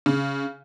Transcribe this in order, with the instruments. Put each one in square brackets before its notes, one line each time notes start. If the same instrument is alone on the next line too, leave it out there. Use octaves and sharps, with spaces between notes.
[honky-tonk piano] C#3